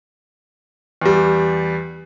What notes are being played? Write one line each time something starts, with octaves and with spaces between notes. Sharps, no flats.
E2 G3